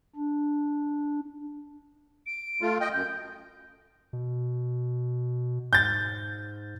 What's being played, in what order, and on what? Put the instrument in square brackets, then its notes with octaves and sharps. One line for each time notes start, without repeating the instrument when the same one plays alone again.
[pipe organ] D4
[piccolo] D7
[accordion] A3 F4
D#5 G5
[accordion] F#2 [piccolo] G6
[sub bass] B2
[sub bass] G#2 [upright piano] G6 A6